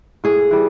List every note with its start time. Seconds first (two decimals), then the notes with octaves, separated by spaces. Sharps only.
0.24 A2 G#4
0.51 E3 G3